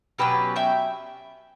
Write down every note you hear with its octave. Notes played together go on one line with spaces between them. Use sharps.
B2 F#3 C#4 G4 B4
E5 G5